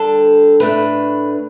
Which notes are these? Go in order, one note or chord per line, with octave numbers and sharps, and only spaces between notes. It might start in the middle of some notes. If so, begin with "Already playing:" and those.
Already playing: D3 G3 D4 A4
A2 A3 D4 B4